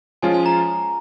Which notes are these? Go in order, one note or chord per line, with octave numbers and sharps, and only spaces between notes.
F3 G#3 C#4 F4 G#5
G#5
A#5